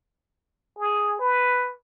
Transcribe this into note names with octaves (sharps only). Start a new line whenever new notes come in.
G#4
B4